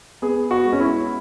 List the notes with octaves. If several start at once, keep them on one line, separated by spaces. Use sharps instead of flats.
B3 G#4
F#4
G#3
C#4
E4